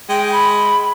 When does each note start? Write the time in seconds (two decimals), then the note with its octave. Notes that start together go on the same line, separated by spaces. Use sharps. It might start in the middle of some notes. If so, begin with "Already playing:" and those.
0.09 G#3 G5
0.32 B5